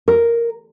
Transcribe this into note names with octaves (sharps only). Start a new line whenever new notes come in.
A#4